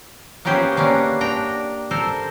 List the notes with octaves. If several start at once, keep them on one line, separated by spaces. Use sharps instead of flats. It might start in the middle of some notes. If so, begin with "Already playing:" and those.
A#3 B3 C#4 G4 G#4 C5
A#3 B3 C#4 D4
D4 G5 A#5
A4 A#4 C5